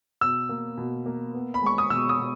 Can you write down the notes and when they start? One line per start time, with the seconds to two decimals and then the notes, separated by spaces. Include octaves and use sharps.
0.21 B2 E6
0.49 A#3
0.77 B2
1.06 A#3
1.34 B3
1.54 B5
1.62 G#3 C#6
1.78 D#6
1.90 B2 E6
2.09 D#6
2.19 B2